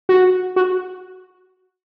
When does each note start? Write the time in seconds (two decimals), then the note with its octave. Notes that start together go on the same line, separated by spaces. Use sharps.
0.09 F#4
0.56 F#4